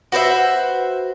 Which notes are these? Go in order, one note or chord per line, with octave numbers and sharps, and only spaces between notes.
F#4 B4 C5 E5